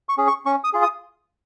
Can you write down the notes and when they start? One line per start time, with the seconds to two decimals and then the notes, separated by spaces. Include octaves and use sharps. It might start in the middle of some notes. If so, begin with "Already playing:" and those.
0.09 C#6
0.18 C#4 G#4
0.27 C#6
0.46 C#4 C#6
0.64 D#6
0.73 F4 G#4
0.82 D#6